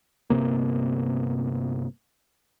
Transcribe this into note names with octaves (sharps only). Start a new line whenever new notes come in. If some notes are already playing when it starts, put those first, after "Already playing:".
G1 F2 C3 A#3